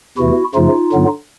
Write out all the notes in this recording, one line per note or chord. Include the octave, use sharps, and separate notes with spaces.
E2 C3 E3 A3 E4 F#4
F#2 C#3 F3 A3 D#4 F4
G2 D3 F#3 B3